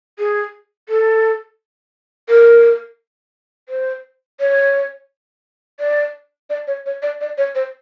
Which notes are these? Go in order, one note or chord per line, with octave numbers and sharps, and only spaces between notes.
G#4
A4
A#4
C5
C#5
D5
D5
C#5
C#5
D5
D5
C#5
C5